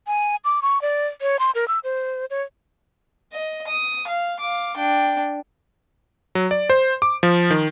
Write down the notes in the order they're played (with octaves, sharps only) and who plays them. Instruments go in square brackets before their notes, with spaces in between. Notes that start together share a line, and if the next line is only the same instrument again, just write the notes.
[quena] G#5
D6
C#6
D5
C#5
C6
A#4
E6
C5
C#5
[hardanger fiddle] D#5
D#6
F5
F5 D6
D4 G5
[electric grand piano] F#3
D5
C5
D6
F3
D#3